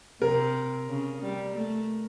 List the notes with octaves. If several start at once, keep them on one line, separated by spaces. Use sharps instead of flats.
C3 A#4
C#3
G3
A3